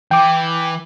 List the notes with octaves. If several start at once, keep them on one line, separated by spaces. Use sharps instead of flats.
E3 G5 D6